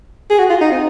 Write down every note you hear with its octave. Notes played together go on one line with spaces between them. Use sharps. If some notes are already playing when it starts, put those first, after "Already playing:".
G#4
F#4
F4
D#4
C4